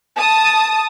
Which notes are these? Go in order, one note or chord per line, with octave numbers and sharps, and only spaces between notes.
A5 D#6